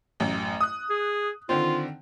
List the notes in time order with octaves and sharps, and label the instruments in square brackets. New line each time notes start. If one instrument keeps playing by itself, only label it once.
[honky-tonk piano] A1 F#2
D#6 F#6
[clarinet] G#4
[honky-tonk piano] D3 D#3 C4 [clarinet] F4